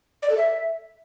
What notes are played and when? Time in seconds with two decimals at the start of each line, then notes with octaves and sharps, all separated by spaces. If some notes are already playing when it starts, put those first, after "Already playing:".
0.22 D5
0.30 A4
0.37 E5